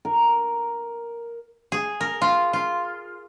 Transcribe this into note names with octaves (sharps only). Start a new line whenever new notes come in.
A#4
G#4
A#4
F4
F4